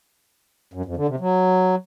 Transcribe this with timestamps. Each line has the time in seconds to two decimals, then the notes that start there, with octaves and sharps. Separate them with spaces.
0.74 F#2
0.85 F2
0.97 D3
1.08 C3
1.20 F#3